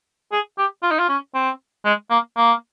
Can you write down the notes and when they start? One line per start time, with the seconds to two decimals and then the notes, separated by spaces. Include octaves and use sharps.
0.32 G#4
0.58 G4
0.83 F4
0.91 D#4
0.99 F4
1.09 C#4
1.34 C4
1.85 G#3
2.10 A#3
2.37 A#3